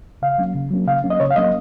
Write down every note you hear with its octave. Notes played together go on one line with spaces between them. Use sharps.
C#3 F5
F#3 A#3 C#4
C#3
F#3 A#3 C#4
C#3 F5
F#3 A#3 C#4
D#5
C#3 C#5
F5
F#3 A#3 C#4 D#5